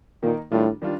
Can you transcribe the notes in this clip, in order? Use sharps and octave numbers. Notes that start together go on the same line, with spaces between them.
A#2 D#3 A#3 D#4
A2 D#3 G3 D4 F4
D#3 G3 D4 F4